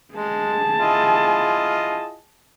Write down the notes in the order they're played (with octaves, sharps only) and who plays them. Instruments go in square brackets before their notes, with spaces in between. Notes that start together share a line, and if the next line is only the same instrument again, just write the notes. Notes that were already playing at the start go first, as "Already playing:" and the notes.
[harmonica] G#3 [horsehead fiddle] G#4 A5
[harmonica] E4 F4 D#5